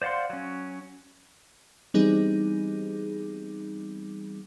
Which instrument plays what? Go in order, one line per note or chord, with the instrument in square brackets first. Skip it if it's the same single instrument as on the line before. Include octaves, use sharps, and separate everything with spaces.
[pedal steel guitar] C5 D5 F5 F#5 C6
F#3 C#4
[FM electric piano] E3 G3 B3 C4 D#4 G#4